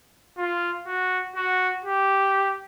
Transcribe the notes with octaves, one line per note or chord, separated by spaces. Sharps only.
F4
F#4
F#4
G4